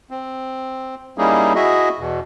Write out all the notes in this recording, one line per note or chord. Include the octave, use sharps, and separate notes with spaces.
C4
G3 A#3 C#4 D#4 E4 G#4
E4 F#4 G#4 D#5 E5
E2 B2